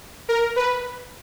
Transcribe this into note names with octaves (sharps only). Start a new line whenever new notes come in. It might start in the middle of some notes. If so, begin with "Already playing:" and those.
A#4
B4